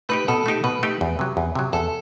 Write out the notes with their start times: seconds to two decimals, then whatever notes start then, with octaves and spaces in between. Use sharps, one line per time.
0.09 A3 D#4 G4 B4
0.28 B2 A4
0.46 A3 D#4 G4
0.64 B2 B4
0.83 A3 D#4 G4
1.01 E2
1.19 C3 F#3
1.37 E2
1.55 C3 F#3
1.73 E2 A4